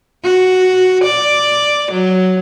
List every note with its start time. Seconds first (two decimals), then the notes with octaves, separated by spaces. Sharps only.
0.24 F#4
1.04 D5
1.92 F#3